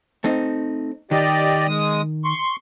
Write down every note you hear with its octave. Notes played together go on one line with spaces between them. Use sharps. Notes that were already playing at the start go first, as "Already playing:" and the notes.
A3 C4 D#4
D#3 G4 D5 D#5
G#3 D#6
C6 C#6